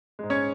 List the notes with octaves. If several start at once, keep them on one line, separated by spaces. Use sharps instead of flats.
G#2 G#3
C#4 C#5